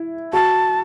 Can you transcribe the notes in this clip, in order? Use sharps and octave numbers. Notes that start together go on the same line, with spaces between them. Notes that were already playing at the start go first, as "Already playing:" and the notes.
Already playing: E4
F#4 A5